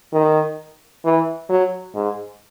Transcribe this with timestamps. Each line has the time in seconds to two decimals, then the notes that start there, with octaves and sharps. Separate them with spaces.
0.13 D#3
1.05 E3
1.49 F#3
1.95 G#2